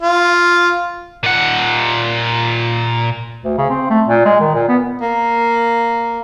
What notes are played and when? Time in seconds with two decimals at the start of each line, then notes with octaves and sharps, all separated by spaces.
0.02 F4
1.23 A#2 F#5
3.44 D2
3.58 C#3
3.70 C4
3.90 A3
4.08 A#2
4.25 G#3
4.40 D#3
4.55 A#2
4.69 B3
5.01 A#3